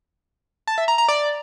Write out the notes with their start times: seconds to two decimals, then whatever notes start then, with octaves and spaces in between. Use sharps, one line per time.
0.67 A5
0.78 E5
0.88 A#5
0.98 A#5
1.08 D5